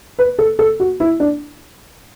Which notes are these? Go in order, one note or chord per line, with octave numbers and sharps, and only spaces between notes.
B4
A4
A4
F#4
E4
D4